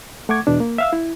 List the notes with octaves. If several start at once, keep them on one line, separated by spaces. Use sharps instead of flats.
A3 F#5 C#6 D6 G#6
E2 B2 D4
A#3
E5 F5 E6
E4